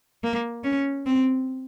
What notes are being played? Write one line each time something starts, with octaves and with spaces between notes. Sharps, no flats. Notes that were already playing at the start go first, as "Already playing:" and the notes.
A#3
C#4
C4